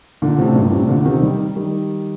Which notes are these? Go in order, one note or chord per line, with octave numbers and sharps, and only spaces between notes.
A#2 D3
A2 C3
G2 A#2
A2 C3
A#2 D3
C3 D#3
D#3 G3
D#3 G3